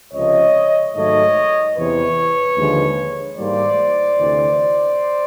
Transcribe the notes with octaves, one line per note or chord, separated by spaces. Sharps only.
C#2 C3 F3 C#5 D#5
G#2 D#3 F#3 A3 C#5 D#5
E2 C3 E3 B4 C#5
D#2 D3 F3 G#3
G#2 E3 G3 A#3 C5 D5
D2 C3 E3